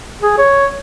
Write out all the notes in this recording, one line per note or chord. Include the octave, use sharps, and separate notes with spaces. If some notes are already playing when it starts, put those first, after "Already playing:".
G#4
C#5